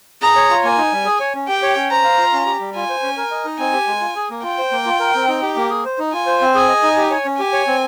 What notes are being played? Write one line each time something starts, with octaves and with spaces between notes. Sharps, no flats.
G#4 A#5
C#5
F4
A#3 G#5
D#4
G3
G#4
C#5
C#4
G4 G5
C#5
C#4
C5 A#5
F5
F4
C#4
G4
G3
F4 G#5
C5
C#4
A#4
D#5
D#4
C4 G#5
G4
G#3
F4
G#4
A#3
F4 G5
C5
A#3
F4
A#4
C4
D#4
G4
A#3
G#4
C5
D#4
F4 G#5
C5
C4
G#4 G#5
D#5
D#4
G4
C#5
C#4
G4 G#5
C#5
C4